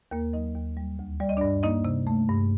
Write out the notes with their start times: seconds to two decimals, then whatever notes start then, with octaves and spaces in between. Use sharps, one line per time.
0.11 D#2 A#3 A#4
0.33 F#3 D#4 D#5
0.55 D#2
0.77 G3
0.99 D2
1.20 G3 D5
1.29 D#5
1.37 G2 D4 D5
1.63 A#3 D#4 D#5
1.85 C3
2.07 A3
2.29 G2